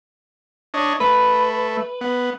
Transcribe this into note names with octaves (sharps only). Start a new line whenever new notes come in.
D4 C#5 D#5
A3 B4
B3